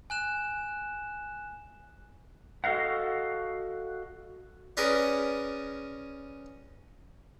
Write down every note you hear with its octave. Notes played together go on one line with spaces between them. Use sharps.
G#5 F#6 E7
F#4 A4 D#5 F5 F#5
C#4 G#4 A#4 B4 D5